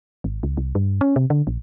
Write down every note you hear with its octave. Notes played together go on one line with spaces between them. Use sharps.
G#1
C#2
C2
G2
C#4
C3
D3
A#1